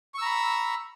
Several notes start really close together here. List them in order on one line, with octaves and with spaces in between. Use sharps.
C#6 E6 A#5 B5